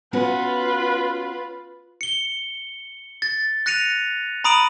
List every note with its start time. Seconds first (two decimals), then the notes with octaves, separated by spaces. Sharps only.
0.13 B3 C#4 F4 F#4 B4
2.01 C#7 G7
3.22 A6
3.66 F#6 A#6 C#7 D#7 F7
4.44 A#5 B5 D#6 D7 D#7 F#7